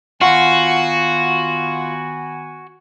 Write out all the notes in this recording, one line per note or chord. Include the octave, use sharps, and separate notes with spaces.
D#3 B3 F4 F#4 F#5 G#5 C#6